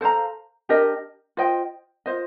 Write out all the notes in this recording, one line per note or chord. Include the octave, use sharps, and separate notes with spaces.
A4 C5 F5 A#5
D4 G4 A#4 D#5
F4 C5 D#5 G5
F4 C5 D#5